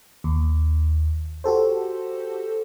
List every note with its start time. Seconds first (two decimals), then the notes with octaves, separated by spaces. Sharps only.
0.24 D#2
1.44 F#4 G4 A4 C5